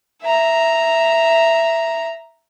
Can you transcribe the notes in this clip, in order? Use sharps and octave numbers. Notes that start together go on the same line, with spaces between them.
E5 A#5